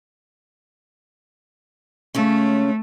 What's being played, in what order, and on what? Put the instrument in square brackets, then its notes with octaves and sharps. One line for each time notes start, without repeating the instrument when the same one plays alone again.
[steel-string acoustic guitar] C#3 G#3 C#4 [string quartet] A3